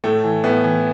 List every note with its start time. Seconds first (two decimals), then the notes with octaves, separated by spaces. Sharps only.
0.04 A2 A3
0.24 E3
0.44 A2 B3
0.64 E3